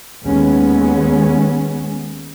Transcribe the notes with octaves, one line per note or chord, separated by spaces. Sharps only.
D#2 G#3 B3 C#4